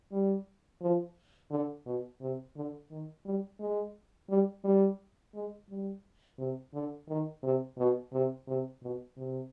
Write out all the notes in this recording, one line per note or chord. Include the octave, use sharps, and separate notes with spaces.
G3
F3
D3
B2
C3
D3
D#3
G3
G#3
G3
G3
G#3
G3
C3
D3
D#3
C3
B2
C3
C3
B2
C3